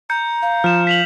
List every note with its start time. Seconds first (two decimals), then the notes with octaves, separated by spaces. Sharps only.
0.10 A#5 G6 C#7
0.42 F5
0.64 F3 F6 E7
0.87 B6 F7 F#7